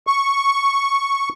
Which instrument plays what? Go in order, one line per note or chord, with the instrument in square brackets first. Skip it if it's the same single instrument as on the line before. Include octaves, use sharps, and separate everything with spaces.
[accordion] C#6